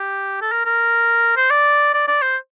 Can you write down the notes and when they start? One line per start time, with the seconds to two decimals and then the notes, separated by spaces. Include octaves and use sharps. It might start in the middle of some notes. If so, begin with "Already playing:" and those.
Already playing: G4
0.41 A4
0.52 A#4
0.65 A#4
1.37 C5
1.50 D5
1.94 D5
2.08 D5
2.22 C5